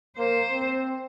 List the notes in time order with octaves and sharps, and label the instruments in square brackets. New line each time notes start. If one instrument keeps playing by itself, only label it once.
[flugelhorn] A#3 [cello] C5
[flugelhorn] C4